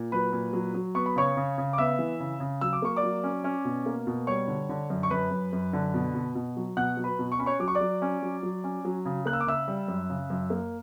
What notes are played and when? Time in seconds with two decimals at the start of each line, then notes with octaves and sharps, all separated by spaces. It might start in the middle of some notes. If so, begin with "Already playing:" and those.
Already playing: A#2
0.12 F#3 B4 B5
0.33 A#2
0.53 F#3
0.74 F#3
0.95 B3 C#6
1.06 B5
1.16 C#3 C#5 C#6
1.37 C#3
1.58 C#3
1.73 D6
1.78 B3 E5 E6
1.99 E3
2.20 C#3
2.40 C#3
2.61 F#3 E6
2.73 D6
2.82 A#3 C#6
2.96 D5 D6
3.03 F#3
3.24 C#4
3.44 C#4
3.65 B2
3.86 A#3
4.07 B2
4.27 G3 C#5 C#6
4.48 D3
4.69 D3
4.90 F#2
5.03 C#6
5.10 F#2 B4 B5
5.31 F#2
5.53 F#2
5.73 D3
5.94 B2
6.14 B2
6.35 B2
6.57 F#3
6.77 B2 F#5 F#6
6.97 F#3
7.04 B4 B5
7.19 B2
7.32 C#6
7.39 C#4 B5
7.46 C#5 C#6
7.60 F#3 D6
7.68 C#6
7.75 D5 D6
7.81 F#3
8.02 C#4
8.22 F#3
8.43 F#3
8.64 C#4
8.85 F#3
9.05 C#3
9.26 A#3 F#6
9.33 E6
9.40 D6
9.47 C#3 E5 E6
9.68 G3
9.88 F#2
10.10 C#3
10.30 F#2
10.50 A#3